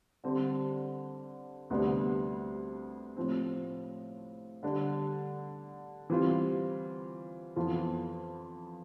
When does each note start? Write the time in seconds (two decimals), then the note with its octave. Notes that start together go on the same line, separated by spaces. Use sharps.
0.24 D3 G3 C4
1.70 D2 C3 G3 B3 D4
3.17 A2 F3 C4
4.63 D3 G3 D4
6.10 E3 G3 C4 F4
7.56 F2 E3 B3 F4